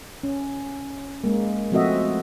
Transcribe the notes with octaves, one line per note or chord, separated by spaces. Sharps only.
C#4
G#3 A#3
F3 A3 C4 F#4 D#5 E5